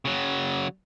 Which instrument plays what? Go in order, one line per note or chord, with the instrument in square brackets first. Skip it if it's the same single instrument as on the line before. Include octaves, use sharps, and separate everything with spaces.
[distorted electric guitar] C#3 F#3